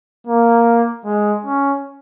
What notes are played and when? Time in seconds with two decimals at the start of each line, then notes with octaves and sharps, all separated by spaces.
0.27 A#3
1.05 G#3
1.44 C#4